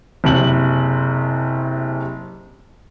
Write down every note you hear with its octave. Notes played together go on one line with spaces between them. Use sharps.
F#1 C3 F#7